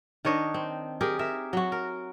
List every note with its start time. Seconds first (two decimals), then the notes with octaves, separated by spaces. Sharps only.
0.25 D#3 D4 C#5 D#5
0.54 C4
1.01 G4 G#4 A#4
1.19 A#4 E5
1.53 F#3 F#4
1.72 A#4